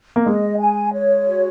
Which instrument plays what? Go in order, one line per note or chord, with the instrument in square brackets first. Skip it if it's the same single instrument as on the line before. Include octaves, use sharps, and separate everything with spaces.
[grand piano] A#3
[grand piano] G#3 [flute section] D#5
[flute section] G#5
C#5
F#4